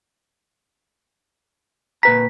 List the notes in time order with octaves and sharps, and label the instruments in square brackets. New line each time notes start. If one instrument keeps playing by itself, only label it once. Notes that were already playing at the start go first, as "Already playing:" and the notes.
[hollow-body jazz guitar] A#2 B4 A#5 [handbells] B6